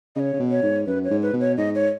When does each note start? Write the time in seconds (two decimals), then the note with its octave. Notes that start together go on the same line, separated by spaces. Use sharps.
0.16 C#3 C#5 D#5
0.33 C#3
0.39 B2
0.51 C#5
0.63 G#2
0.87 F#2 B4
1.04 C#5
1.11 G#2
1.22 B4
1.34 B2
1.40 C#5
1.57 G#2 D#5
1.75 C#5